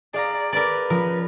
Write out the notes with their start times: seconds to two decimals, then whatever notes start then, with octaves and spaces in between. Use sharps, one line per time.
0.14 G#4 D5 F5 A#5
0.53 A#4 B4 D5
0.90 F3 C#4 A#4